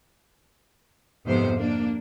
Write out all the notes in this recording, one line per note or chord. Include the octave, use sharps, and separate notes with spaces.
F2 G#2 C3 B3 C5
A#3 D4